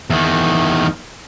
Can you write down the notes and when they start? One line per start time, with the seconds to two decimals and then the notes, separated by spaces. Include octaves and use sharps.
0.10 E2 D#3